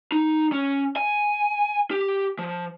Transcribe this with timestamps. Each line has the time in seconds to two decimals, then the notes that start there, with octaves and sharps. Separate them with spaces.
0.12 D#4
0.52 C#4
0.96 G#5
1.91 G4
2.39 F3